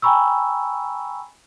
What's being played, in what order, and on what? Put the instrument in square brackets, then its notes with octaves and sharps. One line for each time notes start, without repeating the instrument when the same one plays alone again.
[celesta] G5 G#5 A#5 B5 C#6 E6